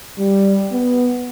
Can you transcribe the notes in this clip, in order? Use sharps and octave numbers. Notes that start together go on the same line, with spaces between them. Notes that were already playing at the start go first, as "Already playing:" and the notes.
G3
B3